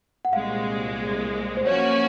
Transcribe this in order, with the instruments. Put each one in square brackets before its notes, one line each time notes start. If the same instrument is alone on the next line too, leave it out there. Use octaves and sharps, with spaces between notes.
[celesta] F#5
[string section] C2 A#2 G#3 [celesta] F5
[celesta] C5
[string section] F3 A#3 C#4 F#4 [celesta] C#5